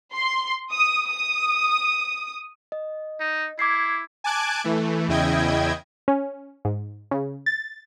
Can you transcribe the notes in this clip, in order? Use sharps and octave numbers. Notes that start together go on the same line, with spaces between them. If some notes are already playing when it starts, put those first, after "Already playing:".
C6
D#6
D#6
D#5
D#4
E4 D6 G#6 C7
G#5 A5 D6 F#6 G#6 D7
E3 A3
E2 C#3 E4 D#5 G5 G#6
C#4
G#2
C#3
A6